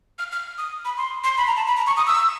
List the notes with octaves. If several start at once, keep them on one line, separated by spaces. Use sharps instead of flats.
F6
F6
D#6
B5
C6
C6
B5
A#5
A5
B5
A#5
C#6
D#6
E6